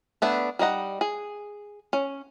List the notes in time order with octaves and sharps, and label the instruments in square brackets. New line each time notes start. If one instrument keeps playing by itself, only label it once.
[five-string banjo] A3 B3 D4
G3 D#4 D#5 F#5
G#4
C#4